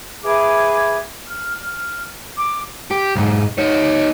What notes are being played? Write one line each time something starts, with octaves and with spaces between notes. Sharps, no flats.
G#4 B4 E5 D6
F6
D6
G4
B1 G#2
D#4 C#5